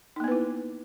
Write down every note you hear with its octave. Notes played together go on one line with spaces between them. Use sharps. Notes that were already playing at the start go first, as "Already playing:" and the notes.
A#3 B3 D#4 E4 B4